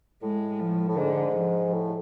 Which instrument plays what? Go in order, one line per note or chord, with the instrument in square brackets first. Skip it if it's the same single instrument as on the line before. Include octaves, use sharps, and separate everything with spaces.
[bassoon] A2 [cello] G#3
[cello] F3
[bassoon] A2
[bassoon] G#2 [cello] D3
[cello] F3
[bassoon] A2